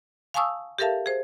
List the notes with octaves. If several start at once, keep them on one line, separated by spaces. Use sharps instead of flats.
F5 G#5 A5 C#6 D#6 E6
G4 A4 A#4 E5 F5 A5
G#4 C5